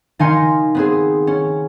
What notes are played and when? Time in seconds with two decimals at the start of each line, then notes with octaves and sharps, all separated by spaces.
0.19 D#3 D#4 F5 G#5 C6 C#7
0.75 B3 C4 G#4
1.27 C#4